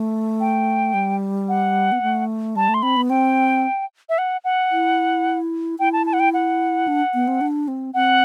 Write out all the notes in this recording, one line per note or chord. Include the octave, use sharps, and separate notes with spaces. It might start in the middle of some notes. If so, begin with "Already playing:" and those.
Already playing: A3
G5
G3
F#5
B3
A3
G3 A5
A3
C6
C4 B5
B3
C4 G5
E5
F#5
F#5
E4
E4 G5
A5
A5
F#5
G5
F#5
D4
B3
C4
D4
C4
C4 F#5